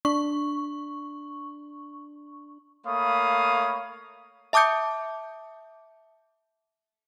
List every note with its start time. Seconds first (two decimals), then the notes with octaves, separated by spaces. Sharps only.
0.05 D4 C#6
2.86 A3 A#3 C#5 F5 B5 D#6
4.53 E5 A5 D6 D#6 G6 C#7